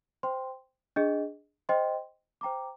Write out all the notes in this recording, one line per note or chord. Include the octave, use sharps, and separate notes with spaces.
C5 G5 C6
D4 G#4 D#5
C5 D#5 G5 C6
C5 G5 A#5 D6